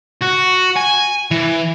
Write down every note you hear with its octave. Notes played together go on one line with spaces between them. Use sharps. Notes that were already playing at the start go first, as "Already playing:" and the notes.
F#4
G#5
E3